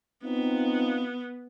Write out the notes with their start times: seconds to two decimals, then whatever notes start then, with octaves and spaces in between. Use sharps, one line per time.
0.24 B3 C4 D#4 F4